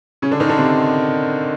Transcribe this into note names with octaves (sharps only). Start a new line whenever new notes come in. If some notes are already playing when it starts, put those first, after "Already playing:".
C#3 C#4
D3 D4
D#3 D#4
D3 D4
C3 C4